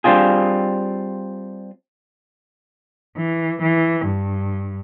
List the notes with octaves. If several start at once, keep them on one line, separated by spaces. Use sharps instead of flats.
G3 C4 D4 F4 G#4
E3
E3
G2